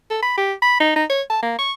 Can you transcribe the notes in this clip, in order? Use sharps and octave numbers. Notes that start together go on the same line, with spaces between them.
A4
B5
G4
B5
D#4
D#4
C#5
A5
A#3
C#6